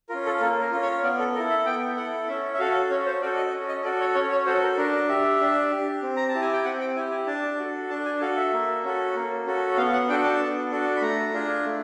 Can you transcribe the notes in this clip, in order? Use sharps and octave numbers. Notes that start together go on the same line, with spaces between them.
C#4 F4 A#4
A4
A#3 A4
A#4
C#4 F4
C#5
B3 D5
A4
A4 A#4
E4
E5
B3 G5
E4 A4 F#5
C#4 E5
E5
F#4 A4 F5
C#4 C#5
C5
F#4 A4 D5
D#5
C#4
D#5
F#4 A4 D5
C#5
C#4 C#5
C#5
F#4 A4 C5
A#4
D4 A#4
G4 E5
D4
G4
C4
A#5
A5
E4 G4
G#5
G5
C4 F#5
G5
E4 G4 G#5
G#5
D4 A5
F#4 A4
D4 A5
G#5
F#4 A4 F5
E5
A#3
C#4 F#4 A4
A#3
C#4 F#4 A4
B3 F5
F#5
D4 F#4 A4 G5
A5
B3
D4 F#4 A4
B5
A3 A#5
D4 F4 G#4
A3